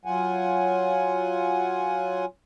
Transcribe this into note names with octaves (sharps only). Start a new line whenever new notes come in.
F#3 F4 F#5 G#5